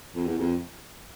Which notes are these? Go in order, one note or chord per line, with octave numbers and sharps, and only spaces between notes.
F2
E2
F2